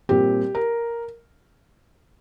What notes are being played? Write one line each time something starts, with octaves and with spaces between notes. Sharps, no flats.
A#2 G3 C4 G4
A#4